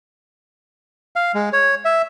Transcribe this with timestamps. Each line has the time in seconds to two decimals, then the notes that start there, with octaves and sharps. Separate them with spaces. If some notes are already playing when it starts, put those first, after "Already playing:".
1.16 F5
1.34 G#3
1.53 C#5
1.85 E5